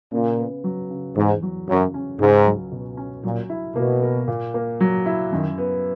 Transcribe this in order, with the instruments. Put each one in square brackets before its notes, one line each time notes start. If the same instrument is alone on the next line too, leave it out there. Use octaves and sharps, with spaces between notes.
[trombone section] A#2 [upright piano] C#3
[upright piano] B3
F#3
C#3
[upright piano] E2 [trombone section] G#2
[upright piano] F#3
[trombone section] F#2 [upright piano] C#3
[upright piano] C#4
[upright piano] C#2 [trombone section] G#2
[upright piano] F#3
B2
C#4
[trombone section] A#2 [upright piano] F#3
[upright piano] E4
[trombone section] B2 [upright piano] A#3
[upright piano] A#4
A#2
A#3
F#3
E4
[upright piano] F#2 [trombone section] D#3
[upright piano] B3